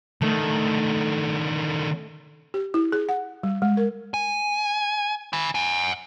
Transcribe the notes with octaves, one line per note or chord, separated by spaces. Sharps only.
D3 D#3 A3
G4
E4
G#4
F#5
G3
G#3
A#4
G#5
G#5 B5
F#5 G#5